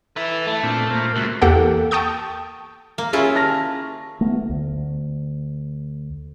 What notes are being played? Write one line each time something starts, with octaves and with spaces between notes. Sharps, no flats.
E4 A4 B4
A3
A#2 C4 D4
A#2 A#3 C5
C#2 F#4 E5
E2 A#3 G4 A4 F#5 G5
G5 A5 C#6 D#6 G6
A#3
C#4 E4 F4 G#4
A5 F6 A#6
A3 B3
D2